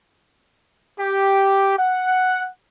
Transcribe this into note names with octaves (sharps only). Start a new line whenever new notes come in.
G4
F#5